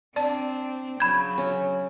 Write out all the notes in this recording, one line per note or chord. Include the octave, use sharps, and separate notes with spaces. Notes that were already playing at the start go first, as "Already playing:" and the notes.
C4 D4 D5 A5
C#3 F#3 B5 G6 G#6
C#4